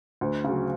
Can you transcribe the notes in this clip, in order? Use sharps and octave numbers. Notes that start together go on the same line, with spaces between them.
D2
C#3
F#3